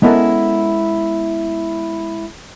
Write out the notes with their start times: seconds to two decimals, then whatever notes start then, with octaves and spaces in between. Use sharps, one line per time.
0.02 G#3 B3 C#4 E4 A4 A#4